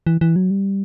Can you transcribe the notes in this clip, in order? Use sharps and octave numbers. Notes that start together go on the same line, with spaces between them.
E3
E3
F#3
G3